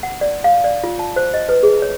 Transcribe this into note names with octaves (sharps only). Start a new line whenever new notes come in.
F#5
D5
F5
D5
F4
A5
C5
D#5
B4
G#4
C#5